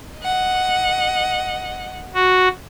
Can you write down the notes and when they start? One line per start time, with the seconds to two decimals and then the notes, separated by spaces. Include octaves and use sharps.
0.20 D#5 F#5
2.14 F#4